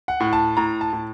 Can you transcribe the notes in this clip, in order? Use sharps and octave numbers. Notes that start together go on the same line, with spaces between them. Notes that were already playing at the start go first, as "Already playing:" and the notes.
F#5
A2
A5
A2 A#5
A5
A2